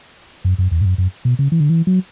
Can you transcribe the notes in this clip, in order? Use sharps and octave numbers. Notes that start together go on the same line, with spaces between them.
F#2
F#2
E2
G#2
F#2
F#2
B2
C#3
E3
D3
E3
F#3